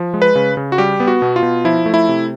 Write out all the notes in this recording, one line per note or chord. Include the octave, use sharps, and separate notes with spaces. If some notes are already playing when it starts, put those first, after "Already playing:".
Already playing: F3
G#3
B4
C#3
C#3
F#4
G3 G4
B3
F#4
B2
F4
B2
F3 E4
A3
E4
C3